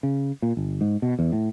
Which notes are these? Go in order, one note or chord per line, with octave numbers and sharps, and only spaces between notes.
C#3
A#2
G1
G#2
B2
E2
A2